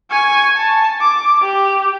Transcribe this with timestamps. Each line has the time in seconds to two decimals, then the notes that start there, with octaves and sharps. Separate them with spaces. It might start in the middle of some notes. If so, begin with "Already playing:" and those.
0.11 G#5 C#6
0.57 A5
1.00 D6
1.42 G4